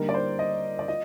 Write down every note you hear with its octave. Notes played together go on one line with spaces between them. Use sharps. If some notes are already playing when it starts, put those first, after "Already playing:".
Already playing: D3 G3 A#3 D#4 A#4
D5
C5
D#5
D5
F4 D#5